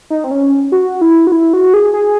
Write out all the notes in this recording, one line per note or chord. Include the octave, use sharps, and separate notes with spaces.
D#4
C4
C#4
F#4
E4
F#4
E4
F#4
G#4
G#4